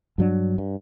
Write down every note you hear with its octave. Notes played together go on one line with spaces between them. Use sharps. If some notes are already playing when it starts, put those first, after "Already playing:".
G2 F#3 D4
G2